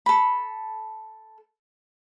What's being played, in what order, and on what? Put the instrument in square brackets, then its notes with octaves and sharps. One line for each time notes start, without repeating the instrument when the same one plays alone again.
[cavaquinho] A4 B5